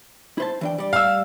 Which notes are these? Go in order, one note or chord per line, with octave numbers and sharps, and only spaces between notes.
E4 C5 A5
E3 D4 G5
G3 D5
F5 E6